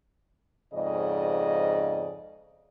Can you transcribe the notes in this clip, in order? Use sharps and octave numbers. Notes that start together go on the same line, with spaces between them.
F2 G#2 C#3 D5 D#5